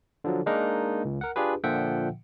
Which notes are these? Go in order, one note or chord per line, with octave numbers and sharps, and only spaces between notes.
D3 F3 F#3
G#3 A#3 D4 D#4 A#4
C#2
A#4 F#5
D4 F4 G4 G#4 B4
A#2 D3 F3 E5 F#5 G5